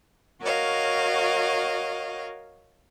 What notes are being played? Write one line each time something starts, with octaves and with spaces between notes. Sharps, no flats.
F#4 A#4 C#5 D#5 F5